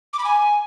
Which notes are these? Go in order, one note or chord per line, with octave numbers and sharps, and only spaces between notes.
D6
B5
G#5